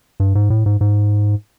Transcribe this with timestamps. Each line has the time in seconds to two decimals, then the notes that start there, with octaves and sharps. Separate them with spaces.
0.20 G2
0.35 G#2
0.50 A2
0.66 G#2
0.81 G#2